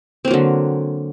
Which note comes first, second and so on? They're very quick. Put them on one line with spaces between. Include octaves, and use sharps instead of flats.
C4 A#3 F#3 D3